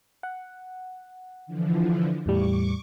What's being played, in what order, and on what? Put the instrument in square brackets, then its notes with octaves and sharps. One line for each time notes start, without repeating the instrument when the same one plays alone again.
[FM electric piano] F#5
[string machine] D3 E3 F3
[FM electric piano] E2 A2 G3 [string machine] C#6 D6